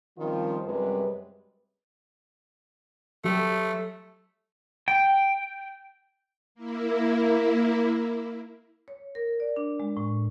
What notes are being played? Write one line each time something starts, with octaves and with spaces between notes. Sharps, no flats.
D#3 F3 G3 C4 C#4 F4
F#2 C3 G3 G#3 B4
F#3 A3 G4
G5
A#3 E4
C#5
A#4
D5
D4
G#3
A2